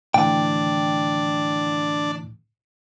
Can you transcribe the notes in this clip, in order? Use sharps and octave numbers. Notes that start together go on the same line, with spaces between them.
A2 D3 E3 D4 G5